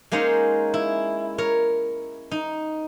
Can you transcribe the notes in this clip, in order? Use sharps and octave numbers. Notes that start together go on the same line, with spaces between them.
G#3 A#3 C#4 D#4 C5 C#5
E4
A#4 C#5
D#4